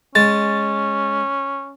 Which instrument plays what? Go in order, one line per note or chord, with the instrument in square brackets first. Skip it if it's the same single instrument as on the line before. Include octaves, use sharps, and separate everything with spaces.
[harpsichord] G#3 [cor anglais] C#4 [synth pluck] A6